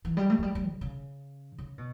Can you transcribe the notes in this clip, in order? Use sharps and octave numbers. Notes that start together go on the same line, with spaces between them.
E3
G3
A3
F#3
G3
G3
C#3
C#3
C#3
B2